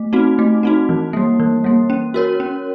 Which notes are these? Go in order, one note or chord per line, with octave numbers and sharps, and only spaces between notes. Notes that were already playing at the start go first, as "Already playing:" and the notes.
Already playing: A3
C4 D#4 F#4
A3
C4 D#4 F#4
E3
G3 A#3
E3
G3 A#3
C#4
F#4 A#4 C#5
C#4